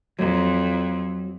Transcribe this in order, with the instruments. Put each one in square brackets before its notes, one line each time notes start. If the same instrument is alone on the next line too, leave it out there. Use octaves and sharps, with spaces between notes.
[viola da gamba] F2 [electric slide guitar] F#3